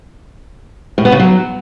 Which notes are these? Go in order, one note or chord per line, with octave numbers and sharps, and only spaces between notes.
A2
B3
C#3
F#3